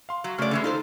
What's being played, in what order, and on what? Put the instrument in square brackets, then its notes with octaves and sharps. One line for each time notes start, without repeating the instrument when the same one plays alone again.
[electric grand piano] F5 C6
[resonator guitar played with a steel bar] F#3
[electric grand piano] C#3 A3 F6 [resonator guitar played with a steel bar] F#3 D5
[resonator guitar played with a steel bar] D3 E3 G#3
[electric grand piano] D#4 [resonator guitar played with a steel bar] F4 A4 C5